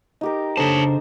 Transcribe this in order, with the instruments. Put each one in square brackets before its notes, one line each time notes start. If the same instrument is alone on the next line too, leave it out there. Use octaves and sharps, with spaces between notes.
[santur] D#4 G4 A#4
[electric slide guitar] C#3 D4 C5 [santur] A4 A#5 D#6 [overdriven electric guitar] C#5 A5